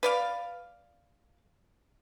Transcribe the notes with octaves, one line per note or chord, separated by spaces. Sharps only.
B4 D5 F5